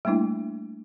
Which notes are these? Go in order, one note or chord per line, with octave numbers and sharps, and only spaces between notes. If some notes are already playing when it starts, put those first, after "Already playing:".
G3 A3 A#3 D4 E4